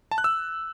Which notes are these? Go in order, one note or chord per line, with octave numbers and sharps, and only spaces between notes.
A5
F#6
E6